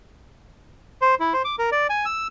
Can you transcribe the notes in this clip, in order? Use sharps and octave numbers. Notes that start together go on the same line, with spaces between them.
C5
E4
C5
D6
A#4
D5
G#5
E6